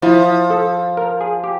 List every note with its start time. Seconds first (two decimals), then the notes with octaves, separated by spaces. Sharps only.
0.02 F3 E4
0.50 A4
0.97 A#4
1.21 G#4
1.44 G4